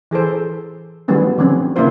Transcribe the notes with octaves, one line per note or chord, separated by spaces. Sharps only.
E3 G#4 A4 C5
D#3 F#3 G3 A3 B3 C#4
D3 F3 C4 C#4
C#3 A#3 E4 F4 C5